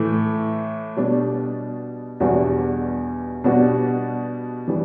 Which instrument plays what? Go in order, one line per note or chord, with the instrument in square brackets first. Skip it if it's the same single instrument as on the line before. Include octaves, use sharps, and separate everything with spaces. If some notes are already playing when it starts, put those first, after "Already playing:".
Already playing: [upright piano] A2 E3 A3
B2 G3 D4
E2 B2 G3 D4 F#4
B2 G3 D4 F#4
E3 G3 D4